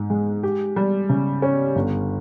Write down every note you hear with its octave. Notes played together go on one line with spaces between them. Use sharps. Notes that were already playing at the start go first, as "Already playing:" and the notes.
Already playing: G#2
G#3
G4
G3
C#3
C#4
G1